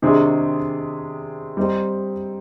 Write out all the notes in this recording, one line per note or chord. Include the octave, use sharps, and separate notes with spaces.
C3 D#3 G#3 D4 G#4
G3 C4 D#4